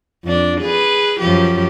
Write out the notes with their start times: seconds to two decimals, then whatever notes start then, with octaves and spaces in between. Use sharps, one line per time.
0.24 F2 D4
0.61 G#4 B4
1.20 F#2 F3 G4